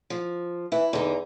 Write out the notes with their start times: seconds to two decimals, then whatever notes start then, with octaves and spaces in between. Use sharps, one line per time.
0.10 F3
0.72 E3 E4
0.93 E2 D3 D#4